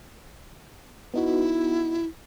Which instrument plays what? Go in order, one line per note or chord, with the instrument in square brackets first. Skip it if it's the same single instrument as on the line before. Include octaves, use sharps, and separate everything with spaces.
[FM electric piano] B3 D#4 F#4 [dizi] E4